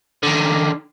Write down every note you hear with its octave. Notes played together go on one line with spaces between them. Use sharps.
D3 D#3